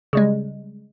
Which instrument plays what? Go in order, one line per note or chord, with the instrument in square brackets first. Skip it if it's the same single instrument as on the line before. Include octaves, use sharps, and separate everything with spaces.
[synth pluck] C#3 G3 G#3